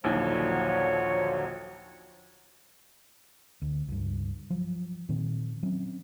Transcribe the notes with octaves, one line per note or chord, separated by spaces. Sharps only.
A#1 D#2 D3 F3 F#3 C#5
D2
C#2 G2
F3 F#3
A#2 D#3 C4
F#3 C4 C#4